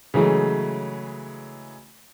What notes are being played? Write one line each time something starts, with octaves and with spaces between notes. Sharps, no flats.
C#3 E3 F#3 G#3 A3